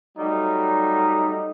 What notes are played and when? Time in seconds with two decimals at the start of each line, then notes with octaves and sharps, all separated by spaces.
0.18 F#3 G3 A3 D#4